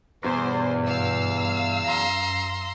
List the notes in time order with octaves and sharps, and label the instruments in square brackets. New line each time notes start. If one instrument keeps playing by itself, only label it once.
[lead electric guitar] E2 [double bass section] G2 B2 [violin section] C5
[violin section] F5 E6
[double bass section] F#2 [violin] A#5 C6